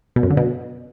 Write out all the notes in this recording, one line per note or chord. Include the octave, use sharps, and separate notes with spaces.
B2
F#2
D3
B2